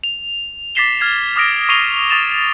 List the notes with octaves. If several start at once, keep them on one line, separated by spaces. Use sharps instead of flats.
F7
D6 A6 B6 C7 E7 G7
F6 G#6 C7
D6 D#6 F6 A#6 D7
C#6 D6 C7 D#7 F7 G7
C#6 D#6 A6 E7 F7